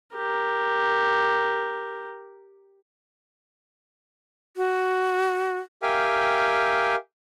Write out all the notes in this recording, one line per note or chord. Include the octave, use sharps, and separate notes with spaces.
G4 A#4
F#4
G4 A#4 E5 F5 G5 G#5